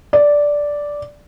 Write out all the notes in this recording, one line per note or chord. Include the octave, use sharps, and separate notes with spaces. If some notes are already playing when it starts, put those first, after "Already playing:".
D5